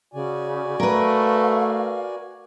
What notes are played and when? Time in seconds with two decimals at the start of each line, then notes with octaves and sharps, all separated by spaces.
0.14 C#3 F#4 D5 G#5
0.80 A3 A#4 B4 F5